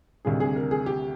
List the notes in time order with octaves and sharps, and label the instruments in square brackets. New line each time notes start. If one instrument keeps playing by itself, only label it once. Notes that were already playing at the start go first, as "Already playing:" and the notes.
[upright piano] D2 C3 D#3 G3 G#4
G#4
A#4
G#4
G4